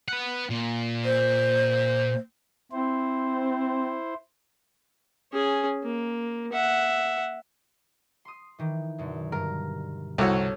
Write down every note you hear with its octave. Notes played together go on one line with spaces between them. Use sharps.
B3 F#5
A#2
C5
C4 E4 C5
C#4 G#4
A#3
E5 F#5
C6 D#6
D#3 E3
F#2 B2 D3
G2 A#4
C2 F#4 A4 C#5